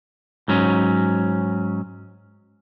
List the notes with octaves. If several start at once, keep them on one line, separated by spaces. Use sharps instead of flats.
G#2 F#3 C#4